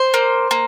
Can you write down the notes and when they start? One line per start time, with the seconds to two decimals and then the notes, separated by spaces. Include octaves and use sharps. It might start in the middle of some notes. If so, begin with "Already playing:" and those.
Already playing: C5
0.14 A#3
0.51 A#3